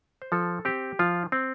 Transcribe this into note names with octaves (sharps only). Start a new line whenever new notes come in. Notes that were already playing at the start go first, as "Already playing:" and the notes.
C5
F3 A4
C4 G4
F3 F4
C4